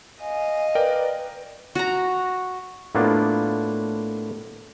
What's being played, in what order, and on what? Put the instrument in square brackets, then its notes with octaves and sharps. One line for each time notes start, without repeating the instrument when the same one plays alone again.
[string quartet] D#5 F5 [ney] G#5
[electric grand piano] A#4 D5 G5 [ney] B4
[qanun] F#4 A#5
[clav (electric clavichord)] A2 A#3 B3 D4 F4